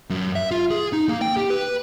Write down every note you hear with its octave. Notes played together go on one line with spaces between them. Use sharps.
F#2
E5
F4
G#4
D#4
A#3
G5
G4
B4